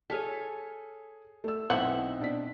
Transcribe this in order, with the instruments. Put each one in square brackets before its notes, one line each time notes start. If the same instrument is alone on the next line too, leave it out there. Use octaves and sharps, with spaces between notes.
[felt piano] G#4 F6 B6 [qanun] A4 C#5 G#5
[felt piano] A3 E6
[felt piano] B1 C5 [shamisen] E3 F#5 [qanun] C4 D#4 E5
[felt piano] B2 D4 B6